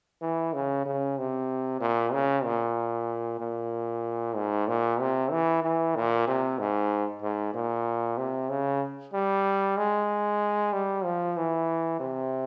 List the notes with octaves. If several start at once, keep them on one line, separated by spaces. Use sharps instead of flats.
E3
C#3
C#3
C3
A#2
C#3
A#2
A#2
G#2
A#2
C3
E3
E3
A#2
C3
G#2
G#2
A#2
C3
C#3
G3
G#3
G3
F3
E3
C3